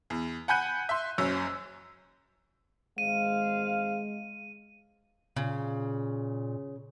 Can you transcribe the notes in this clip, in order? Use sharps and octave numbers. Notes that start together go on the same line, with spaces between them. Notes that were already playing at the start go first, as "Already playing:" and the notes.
E2
F#5 G#5 B5 F#6 G6 D#7
E5 C6
F#1 F#2 C#4 E6
G#1 G#3 C5 F5 D#7
A#2 C#3